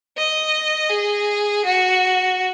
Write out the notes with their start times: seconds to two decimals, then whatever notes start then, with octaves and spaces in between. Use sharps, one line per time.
0.17 D#5
0.90 G#4
1.65 F#4